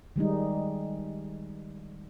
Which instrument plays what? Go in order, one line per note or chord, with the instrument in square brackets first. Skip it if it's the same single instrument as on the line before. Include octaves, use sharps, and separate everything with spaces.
[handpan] D#3 G3 G#3 D#4